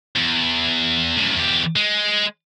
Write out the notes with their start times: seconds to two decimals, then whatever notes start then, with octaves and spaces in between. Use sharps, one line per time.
0.15 E2
1.17 F#2 A2
1.35 E2 G4
1.76 G#3